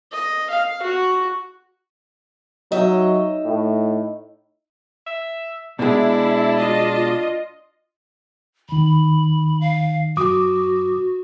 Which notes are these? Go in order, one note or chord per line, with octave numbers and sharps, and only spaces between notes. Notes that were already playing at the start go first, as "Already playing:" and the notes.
D#5
F5
F#4
F#3 D#4 D#5 E5
A2
E5
B2 G#3 D4 E4
F4 D#5
D#2 D#3 B5
F5
F#2 F#4 D6 D#6